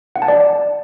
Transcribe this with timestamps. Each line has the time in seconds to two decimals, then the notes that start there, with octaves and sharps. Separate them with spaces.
0.16 F#5
0.22 A5
0.28 D5